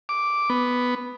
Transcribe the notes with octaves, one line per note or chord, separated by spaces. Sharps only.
D6
B3